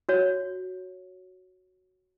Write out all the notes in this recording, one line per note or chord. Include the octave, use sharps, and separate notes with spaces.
F#4 C#5